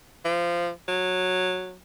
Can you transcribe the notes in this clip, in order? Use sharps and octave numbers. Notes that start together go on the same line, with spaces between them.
F3
F#3